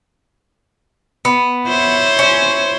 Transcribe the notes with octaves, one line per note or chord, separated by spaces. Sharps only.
B3
E4 C5 C#5
C#4